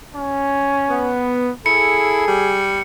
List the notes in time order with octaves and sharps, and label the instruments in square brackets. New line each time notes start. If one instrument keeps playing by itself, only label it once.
[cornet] C#4
[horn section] B3
[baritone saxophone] E4 [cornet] G#4 [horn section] A4 [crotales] C#7
[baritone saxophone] G3